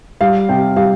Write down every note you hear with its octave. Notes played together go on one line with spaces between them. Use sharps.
G3 F5
C3 G5
G3 F5